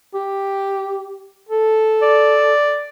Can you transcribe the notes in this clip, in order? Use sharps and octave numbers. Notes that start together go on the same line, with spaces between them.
G4
A4
D5